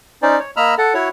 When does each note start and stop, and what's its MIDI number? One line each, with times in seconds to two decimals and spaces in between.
0.22 0.39 61
0.22 0.39 63
0.22 0.39 72
0.22 0.39 74
0.39 0.51 73
0.57 0.75 58
0.57 0.75 75
0.57 0.75 82
0.57 0.75 83
0.57 0.75 88
0.57 0.75 89
0.78 0.94 69
0.78 0.94 78
0.94 1.09 64
0.94 1.09 66
0.94 1.09 73